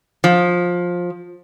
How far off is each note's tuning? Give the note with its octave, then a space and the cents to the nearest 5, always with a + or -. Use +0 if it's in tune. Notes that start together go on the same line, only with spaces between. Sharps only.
F3 +15